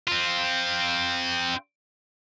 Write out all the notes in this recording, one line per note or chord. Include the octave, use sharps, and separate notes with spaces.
C4 F4